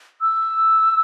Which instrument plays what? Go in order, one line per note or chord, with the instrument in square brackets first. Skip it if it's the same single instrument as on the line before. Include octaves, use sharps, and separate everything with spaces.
[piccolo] E6